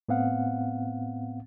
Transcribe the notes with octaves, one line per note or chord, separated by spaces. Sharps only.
A2 B3 C4 F5 F#5